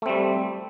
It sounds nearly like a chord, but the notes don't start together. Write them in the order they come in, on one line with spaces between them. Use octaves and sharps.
A3 C4 G3